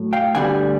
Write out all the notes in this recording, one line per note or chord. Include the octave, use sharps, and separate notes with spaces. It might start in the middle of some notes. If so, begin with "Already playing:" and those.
Already playing: A2 F#3
F5 G5
D2 D3 G3 B3 F#5 G#5